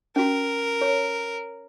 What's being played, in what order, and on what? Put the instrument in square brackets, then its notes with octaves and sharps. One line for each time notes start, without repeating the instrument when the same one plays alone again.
[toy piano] C#4 F#4 [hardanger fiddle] A#4
[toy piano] C#5